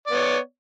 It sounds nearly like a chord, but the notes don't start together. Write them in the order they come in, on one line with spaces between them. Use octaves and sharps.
D5 B3 C#5